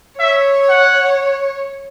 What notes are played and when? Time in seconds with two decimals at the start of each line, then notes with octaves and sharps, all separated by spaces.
0.19 C#5 E5
0.70 F#5